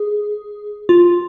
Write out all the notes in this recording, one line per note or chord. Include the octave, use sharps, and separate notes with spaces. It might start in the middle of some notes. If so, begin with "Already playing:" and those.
Already playing: G#4
F4